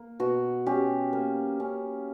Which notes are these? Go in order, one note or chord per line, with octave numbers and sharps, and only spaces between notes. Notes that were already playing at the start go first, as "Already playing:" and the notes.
Already playing: A#3
B2 F#4
C#4 G4
A#3
C#4